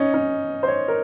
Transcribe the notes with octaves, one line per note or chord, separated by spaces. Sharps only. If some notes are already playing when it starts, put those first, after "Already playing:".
Already playing: C#4 D#4
C#4
C5
C#5
A#4